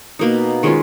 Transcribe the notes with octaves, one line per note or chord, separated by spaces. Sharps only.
B2 A#3 D#4
D#3 G#3 C#4 F4